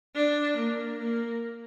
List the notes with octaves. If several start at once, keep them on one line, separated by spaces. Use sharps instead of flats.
D4
A#3
A#3